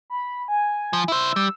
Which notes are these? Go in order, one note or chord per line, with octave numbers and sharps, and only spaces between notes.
B5
G#5
F3
E4 C5 E6
G3